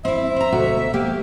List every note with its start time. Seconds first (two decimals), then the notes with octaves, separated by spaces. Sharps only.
0.05 C4 E4 E5
0.36 C4 A#5
0.52 D2 B2 F#4
0.94 A#3 G4